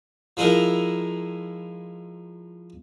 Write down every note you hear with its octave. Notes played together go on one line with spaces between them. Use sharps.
F3 G#3 D#4 E4 A#4